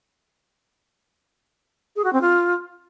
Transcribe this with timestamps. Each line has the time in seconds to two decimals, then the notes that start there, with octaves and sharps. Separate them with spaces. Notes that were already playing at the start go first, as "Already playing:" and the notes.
1.96 G#4
2.04 F#4
2.13 C4
2.21 F4